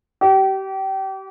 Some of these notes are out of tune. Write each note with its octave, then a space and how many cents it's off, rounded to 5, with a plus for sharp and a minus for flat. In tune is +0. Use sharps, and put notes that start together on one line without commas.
G4 -30